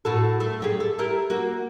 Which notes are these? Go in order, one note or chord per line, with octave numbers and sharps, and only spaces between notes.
A2 F#4 A4
A3
F#2 G4 G#4
A4
E4 G4 A#4
A#3 F#4